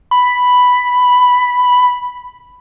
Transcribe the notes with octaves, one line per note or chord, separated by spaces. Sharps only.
B5